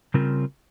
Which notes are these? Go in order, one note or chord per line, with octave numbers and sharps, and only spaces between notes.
C#3 G3 C4 F4 A#4